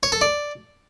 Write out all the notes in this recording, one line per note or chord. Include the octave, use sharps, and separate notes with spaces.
C#5
A4
D5